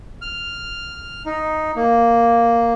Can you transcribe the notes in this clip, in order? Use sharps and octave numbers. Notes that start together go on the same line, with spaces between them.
F6
D#4
A#3